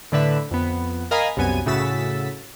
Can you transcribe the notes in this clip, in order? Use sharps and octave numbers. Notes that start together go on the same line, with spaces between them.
A2 D3 B4 E5
F2 B3
A#4 D#5 F5 G#5 A#5 B5
C2 F#2 B3 G#5 D#7
A2 C#3 F#4 E6 A6 B6